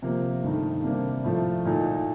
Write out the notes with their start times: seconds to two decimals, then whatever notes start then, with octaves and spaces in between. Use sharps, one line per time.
0.02 C3 F3 A#3
0.43 G2 D#3 A3 D#4
0.84 C3 G3 A#3 D4
1.24 A2 F3 A3
1.65 A#2 A3 D#4